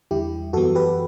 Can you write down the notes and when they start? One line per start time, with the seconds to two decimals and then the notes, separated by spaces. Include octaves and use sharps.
0.11 E2 D3 G3 E4 G4
0.53 F#2 E3 B3 F#4 A4
0.75 G4 B4